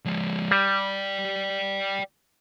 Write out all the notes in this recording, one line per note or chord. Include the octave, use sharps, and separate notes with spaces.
F3 G#3
G3 D5 G5